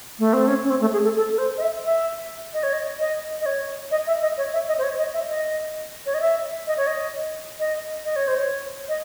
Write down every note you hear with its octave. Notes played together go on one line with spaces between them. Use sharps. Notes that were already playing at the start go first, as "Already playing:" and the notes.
A3
C4
C#4
C#4
C4
A3
G#4
A4
A4
A4
C5
D#5
E5
E5
D#5
C#5
D#5
D#5
D#5
C#5
D#5
E5
D#5
C#5
E5
D#5
C5
C#5
D#5
E5
D#5
C#5
D#5
E5
D#5
C#5
D#5
D#5
D#5
C#5
C5
C#5
D#5